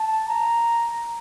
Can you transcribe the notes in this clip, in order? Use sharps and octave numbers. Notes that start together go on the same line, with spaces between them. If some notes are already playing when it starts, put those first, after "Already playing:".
Already playing: A5
A#5